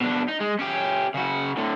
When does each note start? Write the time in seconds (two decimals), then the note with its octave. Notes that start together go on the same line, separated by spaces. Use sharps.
0.01 B2 D4
0.28 D#4
0.40 G#3
0.59 C#4 G4
1.14 C#3 F#4
1.57 A2 D3